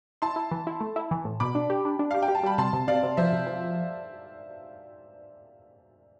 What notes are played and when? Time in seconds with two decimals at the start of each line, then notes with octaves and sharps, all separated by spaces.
0.22 E4 A5 C6
0.36 E4
0.51 E3
0.67 E4
0.81 A3
0.96 E4
1.11 E3
1.25 A2
1.40 B2 B5 D6
1.55 D4
1.70 G4
1.85 D4
1.99 D4
2.11 G4 F5
2.23 G5
2.28 G4
2.35 A5
2.43 G3 B5
2.58 C3 A5 C6
2.73 C3
2.88 C3 D5 F5
3.03 C3
3.17 F3 C5 E5
3.33 C3
3.47 F3